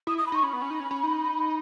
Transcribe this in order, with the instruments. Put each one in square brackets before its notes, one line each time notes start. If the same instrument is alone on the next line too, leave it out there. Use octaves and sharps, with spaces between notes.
[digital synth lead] E4 [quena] D#6
[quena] D#6
B5
[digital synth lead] D#4 [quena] C#6
[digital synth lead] C#4 [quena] B5
[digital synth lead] B3
C#4
D#4
C#4
C#4
D#4